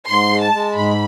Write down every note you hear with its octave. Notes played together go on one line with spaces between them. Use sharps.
G#2 C6
G#3
A5
G#3
G#2 B5